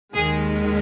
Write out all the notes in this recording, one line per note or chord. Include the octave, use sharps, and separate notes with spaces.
D#2 D#3 G#3 G#4